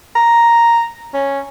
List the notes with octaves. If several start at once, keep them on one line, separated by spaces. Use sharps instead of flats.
A#5
C#4